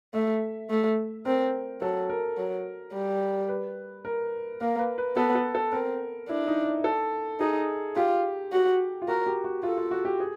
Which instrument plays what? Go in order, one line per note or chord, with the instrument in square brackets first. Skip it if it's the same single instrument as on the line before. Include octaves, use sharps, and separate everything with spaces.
[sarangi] A3 [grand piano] E5
[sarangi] A3
[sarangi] C4 [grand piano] A#4
[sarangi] F#3 [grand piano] A4
[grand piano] A#4
[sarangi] F#3
G3
[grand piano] B4
A#4
[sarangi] A#3 [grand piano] A#4
[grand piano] B4
B4
[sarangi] B3 [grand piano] A4
[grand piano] A4
A4
[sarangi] C4 [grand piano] A#4
[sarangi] D4 [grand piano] E4
[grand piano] D#4
A4
[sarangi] D#4 [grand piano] G#4
[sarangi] F4 [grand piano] G4
[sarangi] F#4
[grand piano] F4
[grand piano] F#4 [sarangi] A#4
[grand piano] G4
F#4
[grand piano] F4 [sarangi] A4
[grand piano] F4
F#4
G4
G#4